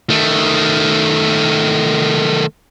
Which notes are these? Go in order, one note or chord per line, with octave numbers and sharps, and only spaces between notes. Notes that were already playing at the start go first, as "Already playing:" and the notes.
D#3 A3